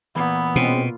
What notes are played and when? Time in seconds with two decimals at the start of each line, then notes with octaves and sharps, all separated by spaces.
0.15 A#2 E3 B3
0.56 B2 G#3 C4 C#4 F4